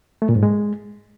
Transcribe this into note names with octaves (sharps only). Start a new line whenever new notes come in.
A3
A#2
G#2
G#3